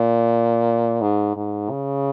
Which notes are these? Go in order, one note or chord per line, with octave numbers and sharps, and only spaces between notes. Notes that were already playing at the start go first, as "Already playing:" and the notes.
Already playing: A#2
G#2
G#2
C#3